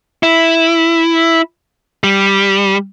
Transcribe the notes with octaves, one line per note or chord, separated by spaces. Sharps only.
E4
G3